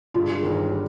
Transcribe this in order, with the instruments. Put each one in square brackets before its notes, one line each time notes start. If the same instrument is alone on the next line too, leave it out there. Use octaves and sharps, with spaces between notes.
[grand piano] G2 D3 G#3 [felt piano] F4
[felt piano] G#4
[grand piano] G1 G2 D#3 [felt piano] A#4
[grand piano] D3 G3